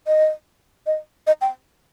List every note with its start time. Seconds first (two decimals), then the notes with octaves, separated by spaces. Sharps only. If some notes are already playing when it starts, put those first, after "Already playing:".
0.07 D#5
0.87 D#5
1.27 D#5
1.41 G5